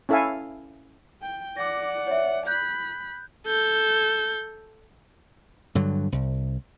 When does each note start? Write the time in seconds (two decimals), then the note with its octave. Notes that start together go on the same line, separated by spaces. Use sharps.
0.09 C#4 E4 A4 E5 F5 G#5
1.21 G5
1.57 D5 F#5 D6 A#6
2.07 C#5 E5
2.47 B5 F#6 G6
3.47 A4 G6
5.75 G2 D3 F#3
6.12 C2